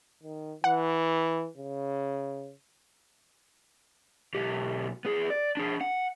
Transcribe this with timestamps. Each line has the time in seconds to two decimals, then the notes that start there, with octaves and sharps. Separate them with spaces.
0.23 D#3
0.64 E3 F#5
1.57 C#3
4.35 B1 G4
5.05 B3 G#4
5.30 D5
5.57 D4 G#4
5.81 F#5